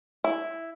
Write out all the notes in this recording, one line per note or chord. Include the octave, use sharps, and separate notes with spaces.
E4